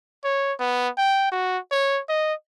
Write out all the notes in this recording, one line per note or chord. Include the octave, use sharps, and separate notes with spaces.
C#5
B3
G5
F#4
C#5
D#5